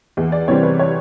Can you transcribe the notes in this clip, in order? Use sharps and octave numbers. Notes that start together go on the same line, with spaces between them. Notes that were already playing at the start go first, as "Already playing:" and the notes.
E2
D5
C3 E3 G3 C4 C#5
B4
C#5